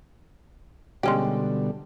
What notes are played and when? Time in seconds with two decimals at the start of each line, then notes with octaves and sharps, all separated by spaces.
1.03 B2 D3 G3 G#3 C#4 G4